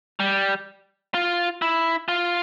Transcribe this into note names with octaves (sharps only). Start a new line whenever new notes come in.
G3
F4
E4
F4